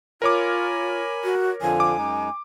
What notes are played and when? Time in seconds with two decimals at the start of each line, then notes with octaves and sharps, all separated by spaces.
0.22 F4 A#4 C#5 G#5 B5 D6
1.24 F#4
1.62 F2 D3 F3 G#5
1.80 D6
1.98 F#2 G#3 D#4